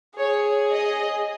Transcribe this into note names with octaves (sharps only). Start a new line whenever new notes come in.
G#4 C#5
D#5